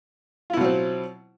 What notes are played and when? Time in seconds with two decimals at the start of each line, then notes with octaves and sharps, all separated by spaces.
0.50 F4
0.53 E4
0.57 B2
0.61 F#3
0.64 C4